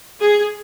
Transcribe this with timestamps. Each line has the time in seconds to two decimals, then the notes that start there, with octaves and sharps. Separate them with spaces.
0.21 G#4